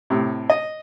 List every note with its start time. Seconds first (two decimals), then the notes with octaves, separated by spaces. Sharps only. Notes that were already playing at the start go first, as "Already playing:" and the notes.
0.10 A2 C3
0.50 D#5